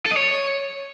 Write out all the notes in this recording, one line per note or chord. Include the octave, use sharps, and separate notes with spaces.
A4
D#5
C#5